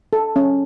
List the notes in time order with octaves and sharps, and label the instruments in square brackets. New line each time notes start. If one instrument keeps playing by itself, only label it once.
[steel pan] A4
C#4